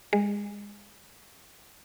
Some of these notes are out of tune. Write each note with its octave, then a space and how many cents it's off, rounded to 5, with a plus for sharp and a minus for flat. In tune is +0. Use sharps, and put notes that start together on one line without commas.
G#3 -25